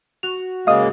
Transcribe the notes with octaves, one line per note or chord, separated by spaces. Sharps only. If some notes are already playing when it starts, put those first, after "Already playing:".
F#4 F7
C#3 G#3 A#3 D#5 F5 D#6